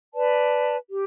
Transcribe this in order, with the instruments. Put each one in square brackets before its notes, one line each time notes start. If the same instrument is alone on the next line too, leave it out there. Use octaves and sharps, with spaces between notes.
[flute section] B4 D5 A5
G4